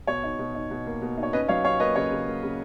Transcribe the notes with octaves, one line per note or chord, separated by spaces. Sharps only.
B2 C#5
D#4
B2
D#4
B2
A#3
B2
D#4
C#5
C#4 B4 D#5
F#3 C#5 F5
C#4 C#5 F5
A#3 B4 D#5
C#3 C#5
C#3
A#3
C#3